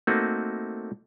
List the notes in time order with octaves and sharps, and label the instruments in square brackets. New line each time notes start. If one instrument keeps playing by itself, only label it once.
[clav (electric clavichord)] A3 A#3 C4 D#4 F#4